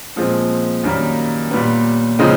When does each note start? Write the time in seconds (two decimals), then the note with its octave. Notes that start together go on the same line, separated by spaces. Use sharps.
0.16 A#2 F3 G#3 C4
0.84 F#2 D#3 G3 A#3
1.51 A#2 G3 B3
2.19 C#3 F3 G#3 C4 D#4